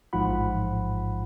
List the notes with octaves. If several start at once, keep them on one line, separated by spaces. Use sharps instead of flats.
A1 G#2 F3 F4 F#5 B5